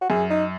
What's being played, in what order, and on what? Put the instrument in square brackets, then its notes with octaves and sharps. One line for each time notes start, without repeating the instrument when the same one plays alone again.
[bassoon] F#4
[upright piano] F#2 [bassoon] G#4
[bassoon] D#4